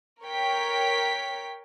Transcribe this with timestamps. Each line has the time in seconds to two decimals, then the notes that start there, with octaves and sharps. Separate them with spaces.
0.22 A#4 C#5 G5 B6